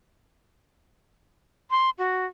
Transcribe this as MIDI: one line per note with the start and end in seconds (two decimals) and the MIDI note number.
1.71 1.90 84
1.98 2.26 66